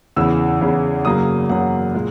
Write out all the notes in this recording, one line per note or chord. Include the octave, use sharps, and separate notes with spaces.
E2 C#3 E3 E6
E2 C#3 E3
F#2 C#3 F#3 A#3 D#6
F#2 C#3 F#3 A#3 F#5
A#2 G#3